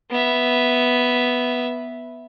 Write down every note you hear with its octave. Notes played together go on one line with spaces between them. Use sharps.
B3 E5